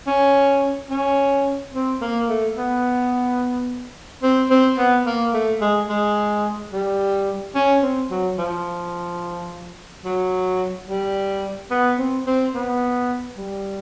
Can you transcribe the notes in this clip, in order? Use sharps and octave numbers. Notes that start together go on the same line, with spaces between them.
C#4
C#4
C4
A#3
A3
B3
C4
C4
B3
A#3
A3
G#3
G#3
G3
C#4
C4
F#3
F3
F#3
G3
B3
C4
C4
B3
G3